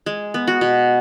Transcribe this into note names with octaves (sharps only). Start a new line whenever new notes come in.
G#3
B3
F#4
B2